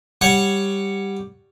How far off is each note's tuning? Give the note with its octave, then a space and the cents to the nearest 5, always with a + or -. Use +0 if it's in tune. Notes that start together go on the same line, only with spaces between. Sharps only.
G3 +5 C#5 +0 F#5 +0